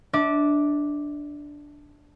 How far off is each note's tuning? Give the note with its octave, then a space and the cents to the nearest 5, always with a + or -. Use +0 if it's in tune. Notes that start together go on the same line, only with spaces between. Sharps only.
D4 +0 E5 -35 D6 +0